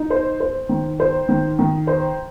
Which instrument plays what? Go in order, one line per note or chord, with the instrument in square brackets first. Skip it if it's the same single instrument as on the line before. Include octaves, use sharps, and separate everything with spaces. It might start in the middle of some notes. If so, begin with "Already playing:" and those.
Already playing: [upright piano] D#4
C5
C5
D#3
C5
D#3
D#3
C5